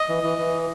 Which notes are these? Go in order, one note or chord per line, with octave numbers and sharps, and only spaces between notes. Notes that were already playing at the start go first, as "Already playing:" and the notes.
Already playing: D#5
E3
E3
E3